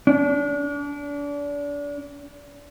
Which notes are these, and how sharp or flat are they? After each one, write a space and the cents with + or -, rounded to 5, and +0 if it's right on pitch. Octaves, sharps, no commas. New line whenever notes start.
D4 -30